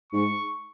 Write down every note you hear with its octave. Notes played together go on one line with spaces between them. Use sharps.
G#2 C#6